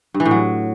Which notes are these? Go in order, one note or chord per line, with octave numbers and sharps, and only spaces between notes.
G2
E3
A2
F#3